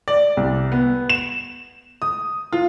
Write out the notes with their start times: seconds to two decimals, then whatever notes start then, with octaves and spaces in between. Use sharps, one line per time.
0.08 D5
0.37 C2
0.72 B3
1.10 E7
2.02 D#6
2.53 F4